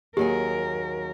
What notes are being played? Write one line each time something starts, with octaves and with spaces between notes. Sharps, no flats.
D#2 F#3 G4 G#4 A#4